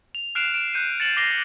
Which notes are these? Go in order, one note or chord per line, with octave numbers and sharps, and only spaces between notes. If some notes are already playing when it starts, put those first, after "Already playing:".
F7
F6 F#6 C7 D7 E7 F7
D7 E7
F#6 G6 C#7 D#7
A6 C#7 E7 F#7
D6 A#6 C7 F7 G7